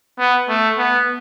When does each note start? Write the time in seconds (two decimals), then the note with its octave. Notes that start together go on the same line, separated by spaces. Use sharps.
0.19 B3
0.49 A3
0.78 B3